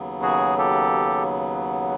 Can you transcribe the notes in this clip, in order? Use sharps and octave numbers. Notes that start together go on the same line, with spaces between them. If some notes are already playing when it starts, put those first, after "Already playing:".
Already playing: D#2 C#3 F#3 B3
F#4 G#4
G4 A4